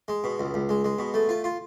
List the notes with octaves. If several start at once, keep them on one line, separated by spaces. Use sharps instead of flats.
G#3
B2
C#2
C#2
G#3
G#3
B2
A3
F4
F4